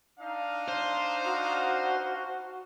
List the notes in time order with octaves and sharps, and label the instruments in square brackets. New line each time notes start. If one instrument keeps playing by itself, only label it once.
[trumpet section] D4 D#4 F5
[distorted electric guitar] C5
[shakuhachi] F#4